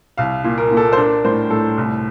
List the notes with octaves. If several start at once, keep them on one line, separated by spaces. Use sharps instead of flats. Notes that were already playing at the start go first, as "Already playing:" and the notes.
C2 F5
A#2
A#4
A#2
A4
C5
D4 A#4
A2 C5
A2 A4
C2